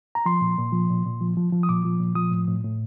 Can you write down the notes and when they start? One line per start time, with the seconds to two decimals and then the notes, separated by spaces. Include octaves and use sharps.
0.15 A#5
0.26 F3 C6
0.41 A#2
0.58 A#2
0.73 F3
0.90 A#2
1.05 A#2
1.21 F3
1.37 F3
1.53 F3
1.63 D#6
1.69 A#2 D6
1.85 F3
2.00 A#2
2.15 F3 D#6
2.31 A2
2.48 A2
2.64 A2